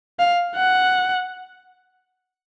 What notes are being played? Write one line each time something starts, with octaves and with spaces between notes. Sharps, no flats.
F5
F#5